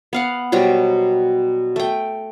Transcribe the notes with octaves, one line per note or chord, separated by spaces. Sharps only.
B3 F5 F#5
B2 F#3 G3 C5
A3 G5